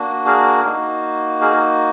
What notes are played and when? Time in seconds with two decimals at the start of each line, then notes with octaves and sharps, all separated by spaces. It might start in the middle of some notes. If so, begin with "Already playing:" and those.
Already playing: A#3 D4 F#4
0.26 G#4 A#4
0.64 A#3 D#4 F#4
1.41 G#4 A#4